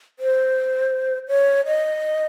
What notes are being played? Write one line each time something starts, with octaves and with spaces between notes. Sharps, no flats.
C5
C#5
D#5